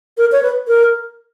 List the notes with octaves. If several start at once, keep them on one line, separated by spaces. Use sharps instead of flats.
A#4
C#5
B4
A#4